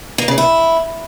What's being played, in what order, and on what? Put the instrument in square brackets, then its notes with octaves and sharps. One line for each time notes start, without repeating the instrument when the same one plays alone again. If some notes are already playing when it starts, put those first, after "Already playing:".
[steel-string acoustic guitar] A#3
C#3
E4